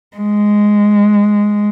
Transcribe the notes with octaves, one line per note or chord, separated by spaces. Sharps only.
G#3